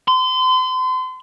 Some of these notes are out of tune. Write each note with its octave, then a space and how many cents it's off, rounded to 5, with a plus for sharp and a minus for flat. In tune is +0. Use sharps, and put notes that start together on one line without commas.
C6 -35